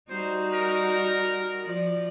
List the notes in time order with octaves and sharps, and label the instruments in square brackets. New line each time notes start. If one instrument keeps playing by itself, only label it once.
[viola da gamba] G3 D#4 F#4 [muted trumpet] C5
[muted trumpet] A#4
[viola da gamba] F3 D5